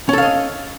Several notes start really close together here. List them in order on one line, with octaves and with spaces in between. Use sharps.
C#4 A4 F5 D#5